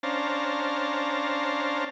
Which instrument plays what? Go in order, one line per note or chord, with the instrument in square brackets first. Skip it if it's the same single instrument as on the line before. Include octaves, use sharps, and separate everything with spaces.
[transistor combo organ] C#4 D4 C5 F5 A5 A#5